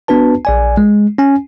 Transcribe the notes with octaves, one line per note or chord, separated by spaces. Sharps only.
B3 D4 F#4 B4 A5
A#1 D5 G#5
G#3
C#4 G#5